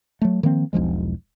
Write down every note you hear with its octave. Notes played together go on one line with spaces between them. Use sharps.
F#3 A3
D#3 F3 A#3 C4
E1 B1 F3 G#3